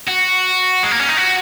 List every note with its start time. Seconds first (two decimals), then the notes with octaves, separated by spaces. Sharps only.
0.08 F#4
0.83 G#3
0.91 A#3
1.00 C#4
1.09 D#4
1.17 F#4